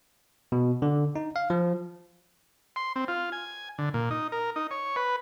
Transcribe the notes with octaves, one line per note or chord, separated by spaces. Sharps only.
B2
D3
D#4
F5
F3
C6
C4
F4
G#5
D3
A#2
D#4
A#4
D#4
C#5
B4